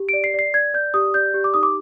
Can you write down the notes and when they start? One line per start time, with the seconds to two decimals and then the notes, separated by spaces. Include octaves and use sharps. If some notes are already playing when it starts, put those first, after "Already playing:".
Already playing: G4
0.09 D5 D7
0.24 C7
0.34 D5 C7
0.54 D5 G#6
0.74 D5 G6
0.94 G4 D#6
1.14 D5 G6
1.34 G4
1.44 D6
1.54 D#4 D#6
1.63 D6